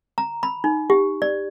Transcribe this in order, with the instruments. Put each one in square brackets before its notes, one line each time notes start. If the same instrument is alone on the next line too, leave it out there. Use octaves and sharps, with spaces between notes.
[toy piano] A#5
B5
D#4
G4
D5